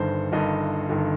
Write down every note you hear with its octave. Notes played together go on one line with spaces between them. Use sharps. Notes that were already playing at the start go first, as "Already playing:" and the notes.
Already playing: G1 G2 D#3 C5
G1 G2 D#3 D#5
G1 G2 D#3